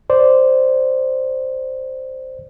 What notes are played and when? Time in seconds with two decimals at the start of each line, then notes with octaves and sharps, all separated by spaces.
0.10 C5 D5